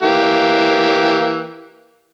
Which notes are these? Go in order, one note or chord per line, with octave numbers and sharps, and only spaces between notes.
E3 A#3 G4